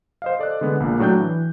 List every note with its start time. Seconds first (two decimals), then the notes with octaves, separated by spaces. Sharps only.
0.22 C5 D#5 F5
0.39 A4 D5 D#5 F#6
0.61 D3 G#3 B3
0.80 A#1 A#2
0.99 A2 F#3 D4 G5 G6
1.21 E3